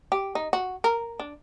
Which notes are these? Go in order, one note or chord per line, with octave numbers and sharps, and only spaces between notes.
G4
D#4
F#4
A#4
D4